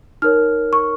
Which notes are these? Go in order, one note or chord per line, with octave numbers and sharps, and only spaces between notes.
D#4 A#4 C#5 F6
C#6